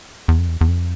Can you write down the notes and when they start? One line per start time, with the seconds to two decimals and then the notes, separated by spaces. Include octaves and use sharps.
0.28 E2
0.39 F2
0.48 E2
0.61 E2
0.68 F2